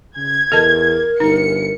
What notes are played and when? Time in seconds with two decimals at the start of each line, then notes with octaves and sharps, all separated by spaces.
0.16 C#3 G#6
0.52 E2 A4 A#4 D#5 A5
1.20 G1 D#4 C#7